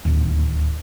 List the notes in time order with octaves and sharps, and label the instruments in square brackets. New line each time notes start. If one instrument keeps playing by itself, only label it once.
[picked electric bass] D1 D#2